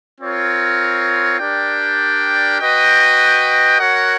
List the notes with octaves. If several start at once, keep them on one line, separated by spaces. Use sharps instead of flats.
C4 F4 A#4 C#5
D4 G4 A#4 D5 G5
F#4 B4 D#5 G5
F#4 A#4 C#5 F#5